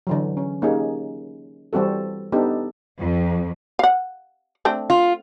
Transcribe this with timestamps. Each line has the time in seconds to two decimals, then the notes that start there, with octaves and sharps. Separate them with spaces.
0.07 D3 E3 F#3
0.37 C#4
0.62 A#3 C#4 D#4 G4 G#4
1.73 E3 G3 C4 F#4 A4
2.32 B3 D4 D#4 G4 A4
2.99 F2
3.79 F5 F#5
4.65 A3 C4 D4
4.90 F4